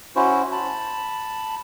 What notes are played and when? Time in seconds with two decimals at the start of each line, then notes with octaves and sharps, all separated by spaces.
0.16 C#4 E4 F#4 C5
0.52 A5 B5